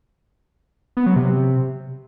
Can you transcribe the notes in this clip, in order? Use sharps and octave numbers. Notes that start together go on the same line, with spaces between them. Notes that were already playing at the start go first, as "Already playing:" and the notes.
B3
F#3
C3